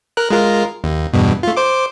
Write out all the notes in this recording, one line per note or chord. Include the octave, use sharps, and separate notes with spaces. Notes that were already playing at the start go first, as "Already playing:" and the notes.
A#4 F#6
G#3 F4 A#4
D#2
E2 G2 B2
A3 F4
C5 D6